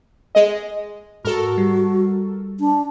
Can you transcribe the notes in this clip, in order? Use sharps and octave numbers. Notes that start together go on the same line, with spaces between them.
G#3 D#5
G#2 F#4 A4 A#4
G3
D4